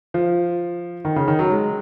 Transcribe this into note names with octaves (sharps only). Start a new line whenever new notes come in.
F3
D#3
C#3
D#3
F#3
G#3